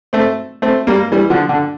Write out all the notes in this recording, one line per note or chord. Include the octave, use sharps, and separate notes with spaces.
A3 C4
A3 C4
G3 A#3
E3 G3
D3 F3
D3